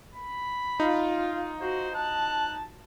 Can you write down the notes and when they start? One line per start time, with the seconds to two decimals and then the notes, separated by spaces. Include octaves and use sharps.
0.14 B5
0.80 D#4 F4
1.61 F#4 C5
1.95 A5 F#6